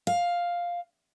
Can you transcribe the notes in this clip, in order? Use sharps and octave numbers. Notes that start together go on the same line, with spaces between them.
F5